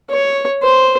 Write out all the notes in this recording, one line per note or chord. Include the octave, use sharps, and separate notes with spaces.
C#5
C5